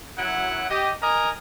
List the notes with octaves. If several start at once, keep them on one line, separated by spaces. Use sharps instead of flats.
F#2 F#3 E4 F#5
G4 D#5
A#4 D#5 G#5 A#5